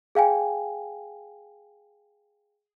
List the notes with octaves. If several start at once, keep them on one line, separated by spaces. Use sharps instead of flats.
G#4 F5 G5 G#5